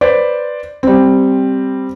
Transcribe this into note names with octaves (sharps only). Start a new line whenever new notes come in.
B4 C5 D5
G3 C4